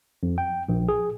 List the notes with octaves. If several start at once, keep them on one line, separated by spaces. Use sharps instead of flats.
F2
G5
A#1
G#4